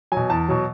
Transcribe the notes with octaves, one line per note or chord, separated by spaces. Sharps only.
B2 F#3 G#5
E2 A5
B2 F#3